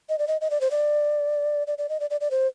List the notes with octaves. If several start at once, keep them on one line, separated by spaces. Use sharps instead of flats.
D#5
D5
D#5
D#5
D5
C5
D5
D5
D5
D#5
D5
D5
D5
C5